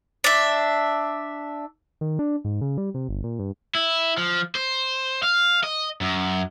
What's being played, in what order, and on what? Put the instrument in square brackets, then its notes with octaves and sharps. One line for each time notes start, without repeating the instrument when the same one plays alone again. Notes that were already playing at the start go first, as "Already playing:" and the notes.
[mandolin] D4 E5
[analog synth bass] D#3
D4
G#2
C#3
G3
C3
G1
A#2
G2
[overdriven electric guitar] E4
F3
C5
F5
D#5
F#2